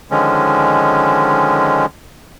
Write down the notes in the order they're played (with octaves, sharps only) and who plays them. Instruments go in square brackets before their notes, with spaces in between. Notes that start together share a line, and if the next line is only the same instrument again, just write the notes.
[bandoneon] D3 D#3 F3 G#3 C#4